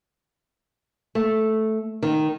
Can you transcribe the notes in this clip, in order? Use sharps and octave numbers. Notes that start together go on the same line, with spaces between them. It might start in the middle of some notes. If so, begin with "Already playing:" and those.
A3
D#3